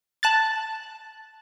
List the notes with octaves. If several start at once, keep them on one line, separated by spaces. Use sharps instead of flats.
A5 F#6 A6